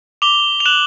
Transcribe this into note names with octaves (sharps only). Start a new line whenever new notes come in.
D6 F7 G7
F7
F#6 E7 F#7